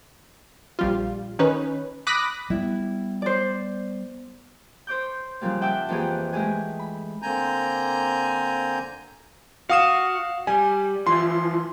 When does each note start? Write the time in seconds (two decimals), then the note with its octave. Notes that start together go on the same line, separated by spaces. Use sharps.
0.79 A#1 G3 F4
1.39 D#3 C#4 D#4 B4
2.07 B5 D6 D#6 F#6 A#6 B6
2.50 G3 B3 E4
3.22 C5 D5
4.87 C5 C#5 D6 G6
5.41 C#3 F3 G3 A#3
5.61 E5 F#5 G5 A5 D6 E6
5.89 F2 E3 A#3 G4 G#4
6.33 G#3 A3 E4 G4 G#4 G#5
6.79 B5
7.22 D3 A#3 C4 G#5 A#5 G6
9.70 F#4 F5 D#6 E7
10.47 G3 G#5
11.07 E3 F3 E4 C6